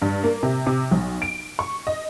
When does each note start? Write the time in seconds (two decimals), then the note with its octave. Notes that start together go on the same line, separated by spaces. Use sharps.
0.02 G2
0.24 A#3
0.43 C3
0.67 C3
0.91 B1
1.22 D7
1.59 C#6
1.87 D#5